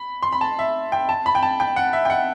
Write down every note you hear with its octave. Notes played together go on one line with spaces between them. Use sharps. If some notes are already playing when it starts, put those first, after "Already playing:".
Already playing: B5
C6
B5
A5
E5
G5
A5
B5
G5
A5
G5
F#5
E5
G5
F#5